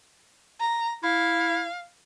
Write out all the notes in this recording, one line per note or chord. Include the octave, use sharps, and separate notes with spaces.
A#5
E4 F5